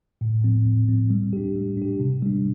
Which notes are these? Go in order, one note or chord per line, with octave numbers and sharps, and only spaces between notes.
A2
F3 C4
A2
F3 C4
G3
D4 G4
G3
D4 G4
C3
G3 D4